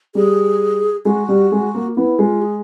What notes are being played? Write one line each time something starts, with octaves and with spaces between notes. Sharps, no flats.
G3 G#4
G#3 F#4
G3
G#3
A#3
B3 E4
G#3 F4
G#4